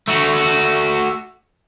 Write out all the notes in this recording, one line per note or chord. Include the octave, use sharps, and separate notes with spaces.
A3 F#4